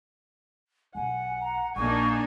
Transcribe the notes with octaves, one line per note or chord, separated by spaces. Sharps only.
B1 F#5 G#5
A#5
A#1 A#3 D4 D#4 G#5 C#6